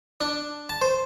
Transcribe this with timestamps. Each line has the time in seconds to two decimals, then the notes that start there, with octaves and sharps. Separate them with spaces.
0.21 D4
0.69 A5
0.82 C5